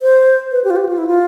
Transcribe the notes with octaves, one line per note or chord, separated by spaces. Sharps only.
C5
B4
G4
F4
G4
F4
E4
F4